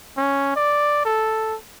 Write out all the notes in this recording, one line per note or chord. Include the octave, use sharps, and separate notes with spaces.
C#4
D5
A4